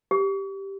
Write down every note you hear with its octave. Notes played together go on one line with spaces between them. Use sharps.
G4